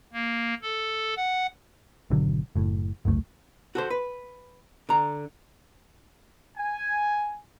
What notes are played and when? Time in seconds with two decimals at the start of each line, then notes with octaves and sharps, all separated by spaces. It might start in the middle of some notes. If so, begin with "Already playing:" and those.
0.13 A#3
0.62 A4
1.17 F#5
2.10 G#1 B2 D3 F#3
2.56 F#1 A2
3.05 G1 C#2 F#2 A3
3.75 F#4 A4 C5
3.90 B4
4.89 D3 A#5
6.58 G#5